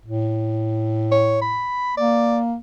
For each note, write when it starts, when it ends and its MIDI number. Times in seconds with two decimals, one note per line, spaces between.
0.05 1.67 45
1.11 1.39 73
1.41 1.94 83
1.97 2.56 58
1.97 2.38 74